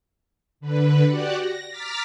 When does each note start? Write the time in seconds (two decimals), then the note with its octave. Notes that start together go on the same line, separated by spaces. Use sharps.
0.60 D3 B4
1.05 F#4 G4 D5 F#5
1.38 A#6
1.68 A#5 D6 F6 A6 B6